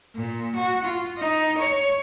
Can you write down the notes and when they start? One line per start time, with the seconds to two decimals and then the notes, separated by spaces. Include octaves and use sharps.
0.16 A#2
0.55 F#4
0.84 F4
1.17 D#4
1.58 C#5